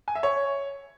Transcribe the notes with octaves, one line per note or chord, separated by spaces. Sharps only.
G#5
E5
C#5